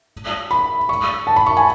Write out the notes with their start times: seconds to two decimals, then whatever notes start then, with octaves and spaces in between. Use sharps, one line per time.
0.51 B5
0.89 C#6
1.27 A5
1.36 B5
1.46 C#6
1.57 G#5